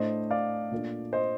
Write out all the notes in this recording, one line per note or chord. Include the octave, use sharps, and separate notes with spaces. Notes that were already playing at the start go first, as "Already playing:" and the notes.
Already playing: A2 A3 D4 C5 D#5
D5 F5
A#2 A3 D4
C5 D#5